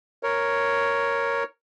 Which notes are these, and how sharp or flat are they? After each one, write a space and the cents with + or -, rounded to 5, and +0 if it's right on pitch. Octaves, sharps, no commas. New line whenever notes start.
A#4 +0 C#5 +0